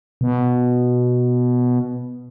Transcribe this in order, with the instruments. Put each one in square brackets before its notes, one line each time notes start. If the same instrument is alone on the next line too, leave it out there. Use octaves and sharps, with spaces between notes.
[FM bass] B2